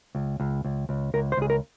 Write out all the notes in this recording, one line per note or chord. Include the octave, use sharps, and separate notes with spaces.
C#2
C#2
C#2
C#2
C#2 A#4
C5
C#2 G#4
A#4